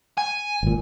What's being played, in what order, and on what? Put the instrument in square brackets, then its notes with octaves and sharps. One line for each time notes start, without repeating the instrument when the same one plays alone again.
[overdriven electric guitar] G#5
[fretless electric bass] G#1 A#2